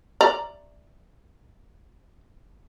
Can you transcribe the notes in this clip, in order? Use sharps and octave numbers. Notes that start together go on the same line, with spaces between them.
D5 A#5